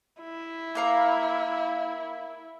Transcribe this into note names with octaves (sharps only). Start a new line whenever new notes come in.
E4
A#3 F5 A#5